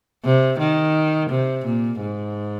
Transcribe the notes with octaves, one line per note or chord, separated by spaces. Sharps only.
C3
D#3
C3
A#2
G#2